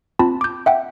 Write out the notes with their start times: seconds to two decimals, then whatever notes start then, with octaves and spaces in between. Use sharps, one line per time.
0.19 C4 F4 A5 B5
0.41 D6 G6
0.66 E5 F#5 G5